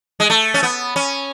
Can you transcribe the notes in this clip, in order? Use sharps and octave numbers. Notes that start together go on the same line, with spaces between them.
G#3
A3
C#4
B3
C#4